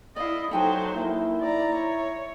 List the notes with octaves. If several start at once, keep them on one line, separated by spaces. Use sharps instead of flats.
E4 D5 D#5 F5
F#3 D#4 A4 C5 G5 G#5
A#3 E4
D5 A#5
C#5